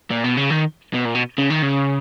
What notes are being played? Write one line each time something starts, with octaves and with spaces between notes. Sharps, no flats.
A#2
B2
C#3
D#3
B2
A#2
B2
C#3
D#3
C#3